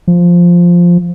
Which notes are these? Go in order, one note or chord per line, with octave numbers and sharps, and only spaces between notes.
F3